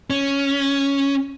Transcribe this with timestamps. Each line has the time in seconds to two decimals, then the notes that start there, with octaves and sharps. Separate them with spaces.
0.10 C#4